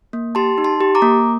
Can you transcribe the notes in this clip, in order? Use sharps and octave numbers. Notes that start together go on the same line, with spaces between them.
A#3
G4 A5 C6
D#4
A5 C6
G4
A#5 D6
A#3